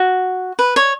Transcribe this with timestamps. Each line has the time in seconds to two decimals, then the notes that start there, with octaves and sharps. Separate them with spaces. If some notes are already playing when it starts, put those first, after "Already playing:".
Already playing: F#4
0.59 B4
0.76 C#5